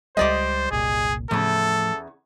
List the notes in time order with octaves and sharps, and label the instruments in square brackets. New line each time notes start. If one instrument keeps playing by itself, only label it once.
[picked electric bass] C#2 G3 G#3 [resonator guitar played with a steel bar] G4 D5 D#5 [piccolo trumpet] C5
[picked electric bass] F#1 C2 A#2 [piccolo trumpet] G#4
[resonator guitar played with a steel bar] E2 C#3 [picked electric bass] A2 F3 A3 [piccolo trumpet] A4